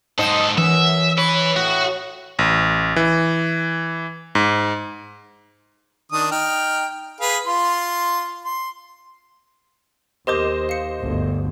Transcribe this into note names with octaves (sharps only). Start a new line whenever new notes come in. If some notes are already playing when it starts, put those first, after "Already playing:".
G#2 D#4 A4 C5 D#5
F#2 E3 E5
E4 B4 C#5
A2 F#4
A1
E3
G#2
D#3 D4 D#6
D#4 G5 F6
G#4 B4 F5
F4 C6
C6
D#2 G4 A#4 C5 D#5 D6 G6
F5 C#7
G1 D2